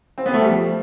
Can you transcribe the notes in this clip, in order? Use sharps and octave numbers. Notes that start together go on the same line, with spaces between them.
C4
B3
A3
G3
F3